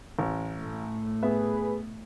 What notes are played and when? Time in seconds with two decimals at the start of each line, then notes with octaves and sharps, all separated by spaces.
0.19 A1
0.59 A2 A3
1.22 B3 G#4 B4 E5